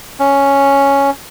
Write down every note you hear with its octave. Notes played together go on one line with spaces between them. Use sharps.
C#4